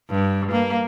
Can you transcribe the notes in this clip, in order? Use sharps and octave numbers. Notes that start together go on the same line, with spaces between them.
G2
A#3